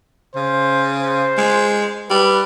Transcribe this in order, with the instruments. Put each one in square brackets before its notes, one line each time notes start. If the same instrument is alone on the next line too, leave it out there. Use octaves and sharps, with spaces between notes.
[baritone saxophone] C#3 [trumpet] C5
[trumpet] C5
[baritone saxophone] G#3
[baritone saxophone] G3 [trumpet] B4